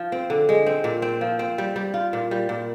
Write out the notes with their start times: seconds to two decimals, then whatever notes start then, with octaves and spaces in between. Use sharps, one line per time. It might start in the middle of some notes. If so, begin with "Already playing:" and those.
Already playing: F3
0.12 C4
0.30 D3
0.49 G#3
0.66 C4
0.84 A#2
1.02 C4
1.21 F3
1.39 C4
1.58 G3
1.76 G3
1.94 F4
2.13 A#2
2.31 G3
2.49 A#2